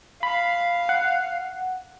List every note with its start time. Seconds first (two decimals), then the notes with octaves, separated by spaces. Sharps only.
0.23 F5 B5
0.89 F#5